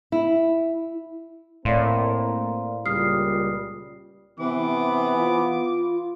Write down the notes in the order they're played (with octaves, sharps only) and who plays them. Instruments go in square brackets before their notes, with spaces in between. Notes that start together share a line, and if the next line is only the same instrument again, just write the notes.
[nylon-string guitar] E4
[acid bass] A2 [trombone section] A#3 C4 A#4 [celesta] D5 F5 C6
[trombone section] C#2 A#2 G3 [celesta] D#6 F6 C7
[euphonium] C3 [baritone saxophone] E3 [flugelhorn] B3 [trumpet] D6
[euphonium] F4